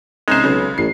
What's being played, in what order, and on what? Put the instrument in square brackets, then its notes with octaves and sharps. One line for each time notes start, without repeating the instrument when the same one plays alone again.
[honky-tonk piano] C2 C#4 D#4 [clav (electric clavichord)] G#3 C5
[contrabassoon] B1 [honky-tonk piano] C#3
[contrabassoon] A1 [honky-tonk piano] C7